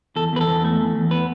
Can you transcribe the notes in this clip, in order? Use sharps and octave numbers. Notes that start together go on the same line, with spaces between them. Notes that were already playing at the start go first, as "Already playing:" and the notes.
E2 A4
E2 B4
A4
E2
A3
E2
E2
B3 B4